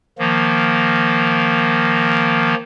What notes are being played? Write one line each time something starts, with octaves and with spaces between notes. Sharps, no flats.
D#3 F3 A#3